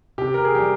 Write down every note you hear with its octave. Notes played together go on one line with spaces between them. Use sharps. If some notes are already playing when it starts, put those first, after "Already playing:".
C3 G4
A#4
G#4
G3 G4